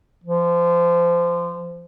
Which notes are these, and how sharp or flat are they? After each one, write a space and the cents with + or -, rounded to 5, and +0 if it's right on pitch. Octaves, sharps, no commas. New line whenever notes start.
F3 -25